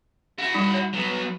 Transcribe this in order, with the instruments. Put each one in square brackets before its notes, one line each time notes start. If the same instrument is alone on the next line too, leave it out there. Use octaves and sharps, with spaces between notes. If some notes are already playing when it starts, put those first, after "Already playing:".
[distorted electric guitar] E4 F#4
[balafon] G3 D#4
C#5
[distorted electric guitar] F#3 B3